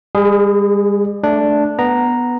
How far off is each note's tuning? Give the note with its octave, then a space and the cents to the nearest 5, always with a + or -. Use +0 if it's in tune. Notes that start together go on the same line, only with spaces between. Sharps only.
G3 +45 G#4 +0
A3 -10 D4 +0
B3 +0 A#5 +0